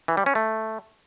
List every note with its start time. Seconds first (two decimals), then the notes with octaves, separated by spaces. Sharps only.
0.08 E3
0.17 G3
0.26 C#4
0.35 A3